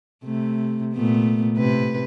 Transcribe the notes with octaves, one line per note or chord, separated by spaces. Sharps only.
C3 A3
A#2 A3 B3
A2 C3 B4